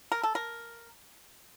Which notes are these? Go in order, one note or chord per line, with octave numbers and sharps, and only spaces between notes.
A#4
A4
A#4